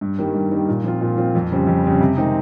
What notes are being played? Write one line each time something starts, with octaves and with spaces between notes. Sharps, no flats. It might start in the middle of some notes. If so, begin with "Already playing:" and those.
G2
D#3 G3 A#3
G2
D#3 G3 A#3
A#2
F3 C4 F4
A#2
F3 C4 F4
F2
C#3 G3 C4
F2
C#3 G3 C4
C3
D#3 G#3 C4 D#4